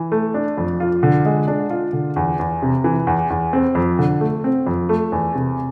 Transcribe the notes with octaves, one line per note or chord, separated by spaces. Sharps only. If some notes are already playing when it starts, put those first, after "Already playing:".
Already playing: E3
A3
D4
F2
F4
D3
G#3
D4
F4
D3
E2
E2
C3
E3
E2
E2
C4
F2
D3
A3
C4
F2
A3
E2
C3